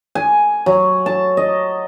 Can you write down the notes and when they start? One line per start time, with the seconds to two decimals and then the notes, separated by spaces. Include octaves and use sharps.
0.15 G#5
0.66 F#3
1.06 A5
1.37 D#5